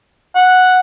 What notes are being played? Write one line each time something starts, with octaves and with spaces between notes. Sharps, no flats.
F#5